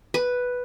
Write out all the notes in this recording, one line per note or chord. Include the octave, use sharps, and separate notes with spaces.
B4